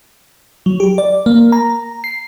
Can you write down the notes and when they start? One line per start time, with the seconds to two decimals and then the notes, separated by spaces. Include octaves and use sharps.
0.66 F#3
0.80 G4
0.98 D5
1.26 A#3
1.52 A#5
2.04 C7